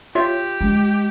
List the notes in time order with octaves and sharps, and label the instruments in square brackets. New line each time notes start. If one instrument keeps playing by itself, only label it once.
[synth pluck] F4 C#5 E5 [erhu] G4
[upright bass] G#3